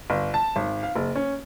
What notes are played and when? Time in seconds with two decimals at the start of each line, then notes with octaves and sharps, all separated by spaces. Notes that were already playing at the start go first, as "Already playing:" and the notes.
0.10 G1
0.34 A5
0.56 G#1
0.83 F5
0.96 F#1
1.16 C#4